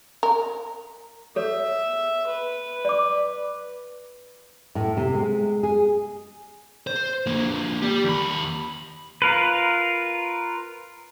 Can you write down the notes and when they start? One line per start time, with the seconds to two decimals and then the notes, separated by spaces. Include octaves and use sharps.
0.23 A#4
1.36 A4 C#5 E5
2.27 B4
2.85 D5 D6
4.75 A2
4.97 C3
5.14 G#3
5.63 G#4
6.87 C5
7.27 D3 A#3
7.82 G4 D5
8.04 D#2 B5
9.22 F4 A#4 B4